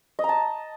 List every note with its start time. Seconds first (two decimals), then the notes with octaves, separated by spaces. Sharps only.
0.19 D#5
0.24 A#5
0.29 A5